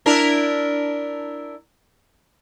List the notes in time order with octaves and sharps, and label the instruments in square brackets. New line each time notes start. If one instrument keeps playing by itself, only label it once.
[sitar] D4 E4 A#4